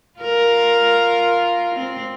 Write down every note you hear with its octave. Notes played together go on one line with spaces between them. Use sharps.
F4 A#4
C4